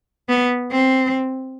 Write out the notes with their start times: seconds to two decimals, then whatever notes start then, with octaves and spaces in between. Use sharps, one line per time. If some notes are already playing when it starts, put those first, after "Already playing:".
0.29 B3
0.72 C4